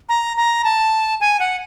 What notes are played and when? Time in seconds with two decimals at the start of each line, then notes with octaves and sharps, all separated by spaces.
0.09 A#5
0.37 A#5
0.64 A5
1.21 G#5
1.40 F#5